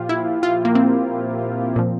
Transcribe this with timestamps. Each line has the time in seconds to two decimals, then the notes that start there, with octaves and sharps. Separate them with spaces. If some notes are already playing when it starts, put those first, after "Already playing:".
Already playing: A#2 F3 F4 G4
0.09 E4
0.43 F4
0.65 A#3
0.75 C4
1.76 A#2 F3